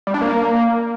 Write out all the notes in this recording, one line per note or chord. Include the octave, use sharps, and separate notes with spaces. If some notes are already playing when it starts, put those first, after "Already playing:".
G3
D4
A#3